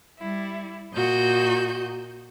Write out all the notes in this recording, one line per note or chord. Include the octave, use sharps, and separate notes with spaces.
G3 E4
A#2 F#4 D#5 G6